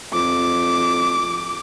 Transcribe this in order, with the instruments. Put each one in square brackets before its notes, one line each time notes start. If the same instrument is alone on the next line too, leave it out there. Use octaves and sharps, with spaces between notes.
[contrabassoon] F2 [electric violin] D6